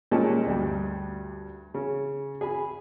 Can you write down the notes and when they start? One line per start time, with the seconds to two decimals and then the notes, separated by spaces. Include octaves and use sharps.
0.11 A#2 G3 G#3 C#4 A5
0.46 D2 G2
1.74 C#3
2.41 G#4 G#5 B5